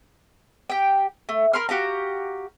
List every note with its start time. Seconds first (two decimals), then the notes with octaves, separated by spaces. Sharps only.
0.70 G4 G5
1.29 A3
1.53 A#4 B5 C6 F6
1.69 F#4 G4 F5 A#5